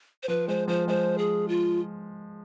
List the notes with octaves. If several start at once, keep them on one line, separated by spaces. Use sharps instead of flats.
C5
F3 B4
G#3 C5
F3 C5
G#3 C5
G#4
F4